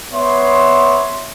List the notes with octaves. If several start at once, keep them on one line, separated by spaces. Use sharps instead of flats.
B3 C#5 E5 C6